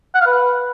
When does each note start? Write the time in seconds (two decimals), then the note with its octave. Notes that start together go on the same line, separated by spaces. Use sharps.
0.15 F#5
0.21 F5
0.27 B4